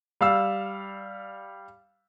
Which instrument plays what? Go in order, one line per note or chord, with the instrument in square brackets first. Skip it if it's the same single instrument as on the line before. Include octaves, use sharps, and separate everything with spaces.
[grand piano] G3 F5 E6